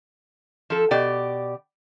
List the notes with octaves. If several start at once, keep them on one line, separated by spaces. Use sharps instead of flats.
F3 A4
B2 G4 D5